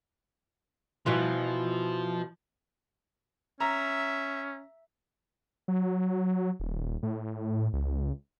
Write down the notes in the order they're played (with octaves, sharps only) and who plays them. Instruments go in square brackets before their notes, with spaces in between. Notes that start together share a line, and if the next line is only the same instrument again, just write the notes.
[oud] B2 E3 F4 [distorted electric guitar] F3
[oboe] C#4 [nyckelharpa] E5 [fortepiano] A#5
[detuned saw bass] F#3
D#1
A2
C#2